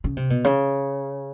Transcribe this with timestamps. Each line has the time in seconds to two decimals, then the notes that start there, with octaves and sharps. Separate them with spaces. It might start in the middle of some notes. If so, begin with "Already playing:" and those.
0.04 C#3
0.17 C3
0.30 B2
0.44 C#3